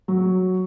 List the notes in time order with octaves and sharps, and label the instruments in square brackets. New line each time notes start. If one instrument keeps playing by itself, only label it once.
[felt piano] F#3